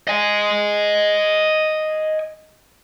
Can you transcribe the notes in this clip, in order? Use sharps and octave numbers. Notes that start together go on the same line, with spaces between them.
D#5 G#5